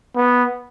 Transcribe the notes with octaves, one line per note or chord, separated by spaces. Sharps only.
B3